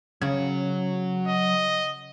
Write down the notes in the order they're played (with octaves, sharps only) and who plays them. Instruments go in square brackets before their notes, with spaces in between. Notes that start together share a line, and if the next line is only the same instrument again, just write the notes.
[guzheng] C#3 [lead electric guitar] F#3 C#5
[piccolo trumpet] D#5